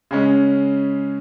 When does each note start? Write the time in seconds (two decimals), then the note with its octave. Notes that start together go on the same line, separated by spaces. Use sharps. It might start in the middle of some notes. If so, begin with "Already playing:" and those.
0.11 C#3 G#3 C#4